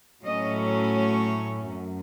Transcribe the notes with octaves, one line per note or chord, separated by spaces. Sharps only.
A2 F#3 A3 C#4 D#5
C#5
F#2